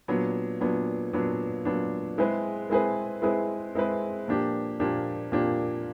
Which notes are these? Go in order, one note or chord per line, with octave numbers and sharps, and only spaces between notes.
A#2 F#3 B3 D4
A#2 F#3 B3 D4
A#2 F#3 B3 D4
A#2 F#3 B3 D4
G#3 C4 E4 G#4 B4
G#3 C4 E4 G#4 B4
G#3 C4 E4 G#4 B4
G#3 C4 E4 G#4 B4
A#2 F3 A#3 D4 G4
A#2 F3 A#3 D4 G4
A#2 F3 A#3 D4 G4